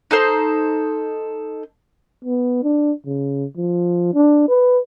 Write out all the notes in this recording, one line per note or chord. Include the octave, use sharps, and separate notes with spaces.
D#4 A4 C5
B3
D4
C#3
F3
D4
B4